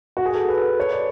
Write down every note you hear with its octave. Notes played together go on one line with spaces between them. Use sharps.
F#4
G#4
A4
B4
C#5
D5